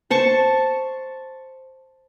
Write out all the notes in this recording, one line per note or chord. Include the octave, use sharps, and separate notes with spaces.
C5 A5 C#6